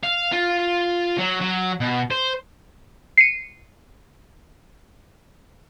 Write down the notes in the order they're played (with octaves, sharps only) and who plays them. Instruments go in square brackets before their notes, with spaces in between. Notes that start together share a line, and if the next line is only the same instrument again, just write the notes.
[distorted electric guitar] F5
F4
F#3
F#3
B2
C5
[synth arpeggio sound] C7 C#7 D#7